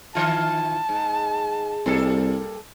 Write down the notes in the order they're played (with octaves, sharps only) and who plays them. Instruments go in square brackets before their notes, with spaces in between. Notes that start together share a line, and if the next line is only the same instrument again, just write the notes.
[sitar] D#3 E3 F4 [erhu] A5
[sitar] G#2
[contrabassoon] C2 [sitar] G3 A#3 A4